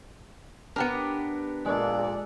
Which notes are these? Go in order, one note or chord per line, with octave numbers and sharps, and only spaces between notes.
B3 D4 G4 A#4
A#1 A#2 G#3 A4 D5